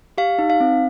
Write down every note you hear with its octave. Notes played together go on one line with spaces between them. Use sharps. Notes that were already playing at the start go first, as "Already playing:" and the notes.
G4 F5
D#4
F5
C4